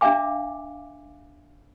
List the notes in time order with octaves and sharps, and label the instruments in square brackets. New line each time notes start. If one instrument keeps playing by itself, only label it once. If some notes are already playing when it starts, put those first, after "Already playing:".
[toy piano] D4 E5 F5 G#5 D6